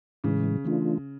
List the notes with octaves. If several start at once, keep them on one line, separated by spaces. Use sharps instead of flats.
A2 C#3 E3 G#3
E3 A3 D4 F4